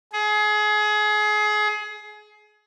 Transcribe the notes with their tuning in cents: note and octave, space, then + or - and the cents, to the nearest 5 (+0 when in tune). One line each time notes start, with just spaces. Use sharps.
G#4 +25